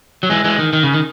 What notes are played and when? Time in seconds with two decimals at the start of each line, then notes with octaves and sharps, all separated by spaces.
0.23 F#3
0.30 E3 G#3
0.44 E3 G#3
0.59 D#3
0.73 D#3
0.83 C#3
0.93 D#3